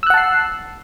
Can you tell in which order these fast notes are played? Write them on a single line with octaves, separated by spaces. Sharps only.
E6 F#6 F#5 A5 C7